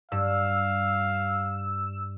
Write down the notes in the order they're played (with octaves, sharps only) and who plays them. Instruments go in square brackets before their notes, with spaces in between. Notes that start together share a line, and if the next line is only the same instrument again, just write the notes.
[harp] G2 [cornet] F5 [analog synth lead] E6